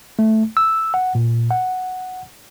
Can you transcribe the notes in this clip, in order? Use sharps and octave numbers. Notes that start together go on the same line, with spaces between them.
A3
E6
F#5
A#2
F#5